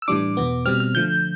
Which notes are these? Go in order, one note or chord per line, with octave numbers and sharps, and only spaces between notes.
E6
A2 E3 G3 D4 D6
E2 B2 B3
B2 G3 C4 F6
F6
D3 F3 A3 G6